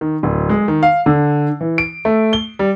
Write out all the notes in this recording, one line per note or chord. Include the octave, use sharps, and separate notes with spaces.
D#3
D1
G#3
D#3
F5
D3
E3
D7
A3
G7
G3